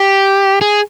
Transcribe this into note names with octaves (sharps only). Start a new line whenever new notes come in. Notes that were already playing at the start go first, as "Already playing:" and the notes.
Already playing: G4
G#4